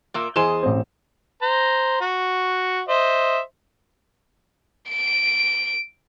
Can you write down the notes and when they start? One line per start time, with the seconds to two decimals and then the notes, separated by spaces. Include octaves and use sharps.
0.14 A#2 A#3 E5
0.36 E2 G#4 C5 D#5 G#5 E7
0.63 A1 C4
1.42 C5 A#5
2.01 F#4
2.88 C5 D#5 E5
4.89 D7